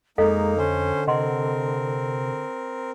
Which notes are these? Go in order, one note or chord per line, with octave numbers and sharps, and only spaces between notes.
F2 G#3 A#3 D#4 A4 D#5 F5
D3 C#4 C5
C3 C4 A#4 D#5 F#5 C6